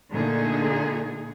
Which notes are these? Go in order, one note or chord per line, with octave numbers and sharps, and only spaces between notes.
A#2 D3 A3 D#4 G#4